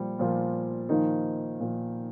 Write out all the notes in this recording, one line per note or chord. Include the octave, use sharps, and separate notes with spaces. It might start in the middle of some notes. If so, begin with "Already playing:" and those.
Already playing: A#2 F3 G3
A#2 F3
A#2 D#3 F3 D#4
A#2 F3